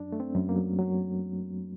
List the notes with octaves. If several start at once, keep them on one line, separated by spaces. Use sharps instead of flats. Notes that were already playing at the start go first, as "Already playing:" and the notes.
Already playing: F#2 D4
A3
C4
F#2
A#3
F#3
F#3